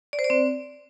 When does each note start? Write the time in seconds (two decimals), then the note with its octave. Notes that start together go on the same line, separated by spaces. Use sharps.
0.13 D5
0.19 C5
0.24 D5
0.30 C4